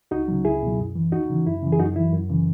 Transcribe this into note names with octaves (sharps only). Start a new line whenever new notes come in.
C#2 D#4 F#4
C#3 F#3
C#2 E4 G#4
B2 F#3
F#2
E3
D#2 D#4 F#4
C#3 E3
F#2 E4
C#3 E3
G#4
F#2 D#4 F#4
E3 E4
F#2
C#3 E3